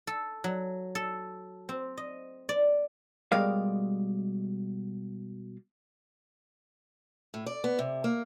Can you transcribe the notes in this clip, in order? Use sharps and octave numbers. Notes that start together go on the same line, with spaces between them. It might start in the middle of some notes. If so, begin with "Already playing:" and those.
A4
F#3
A4
C4
D#5
D5
B2 G3 G#3 A#4 D5 F5
A2
D5
B3
C3
A#3